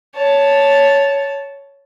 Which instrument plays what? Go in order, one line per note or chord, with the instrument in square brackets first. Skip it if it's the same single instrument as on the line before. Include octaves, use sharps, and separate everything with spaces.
[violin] C#5 A5